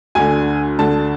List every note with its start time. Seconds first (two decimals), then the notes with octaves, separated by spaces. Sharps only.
0.15 D2 D3 G#5
0.79 D2 D3 A5